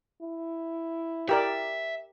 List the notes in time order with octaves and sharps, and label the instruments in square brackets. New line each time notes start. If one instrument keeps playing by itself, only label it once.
[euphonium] E4
[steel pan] G4 A#4 D5 [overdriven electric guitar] E5